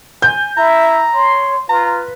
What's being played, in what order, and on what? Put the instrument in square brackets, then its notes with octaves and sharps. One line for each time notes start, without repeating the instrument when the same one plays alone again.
[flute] G#5 [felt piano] G6
[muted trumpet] E4 [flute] E5 [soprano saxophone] A#5
[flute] C#5 [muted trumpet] C6
[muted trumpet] F4 [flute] B4 [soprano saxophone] A#5